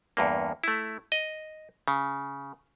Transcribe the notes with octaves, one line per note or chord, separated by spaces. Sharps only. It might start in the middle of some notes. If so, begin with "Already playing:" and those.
E2 G2 A#3
A3 E4
D#5
C#3